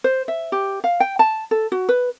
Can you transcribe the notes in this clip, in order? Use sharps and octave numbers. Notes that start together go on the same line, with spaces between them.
C5
E5
G4
F5
G5
A5
A4
F#4
B4